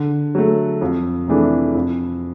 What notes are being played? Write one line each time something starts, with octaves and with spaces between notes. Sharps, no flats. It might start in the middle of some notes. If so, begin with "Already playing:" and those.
Already playing: D3
F#3 A3
F2
C3 E3 A3 D4
F2